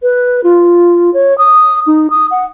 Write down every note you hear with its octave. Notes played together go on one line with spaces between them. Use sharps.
B4
F4
C#5
D#6
D#4
D#6
F#5